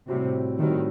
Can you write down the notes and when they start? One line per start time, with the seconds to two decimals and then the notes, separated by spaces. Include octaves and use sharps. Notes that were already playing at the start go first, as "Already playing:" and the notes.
0.08 A2 C3 G3 C4 F#4
0.59 A2 D#3 G3 C4 F#4